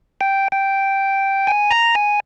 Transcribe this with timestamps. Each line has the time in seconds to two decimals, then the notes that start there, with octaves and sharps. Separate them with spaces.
0.21 G5
0.52 G5
1.47 G#5
1.71 A#5
1.95 G#5